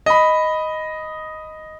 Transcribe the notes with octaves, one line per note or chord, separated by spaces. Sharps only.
D#5 B5